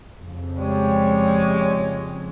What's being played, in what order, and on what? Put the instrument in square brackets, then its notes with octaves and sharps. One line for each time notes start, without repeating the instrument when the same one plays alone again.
[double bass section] F2 C#3
[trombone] G3 [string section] G#3 [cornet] C#5